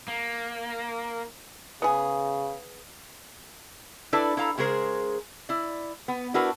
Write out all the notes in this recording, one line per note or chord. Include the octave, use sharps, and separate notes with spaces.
A#3
C#3 B3 G#4
D4 E4 A4 B4 D5
E4 A4 F5 A#5
C#3 G#3 G#4 A#4 C5
E4 D5
B3
D4 E4 F#4 A#4 B4